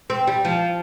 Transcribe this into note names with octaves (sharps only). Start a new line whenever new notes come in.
C4
G3
F3